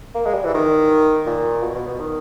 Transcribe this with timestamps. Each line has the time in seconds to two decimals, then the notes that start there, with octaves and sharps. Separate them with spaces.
0.15 A#3
0.25 G#3
0.34 G3
0.44 E3
0.54 D#3
1.27 A#2
1.63 B2
1.75 B2
1.87 B2
1.99 D#3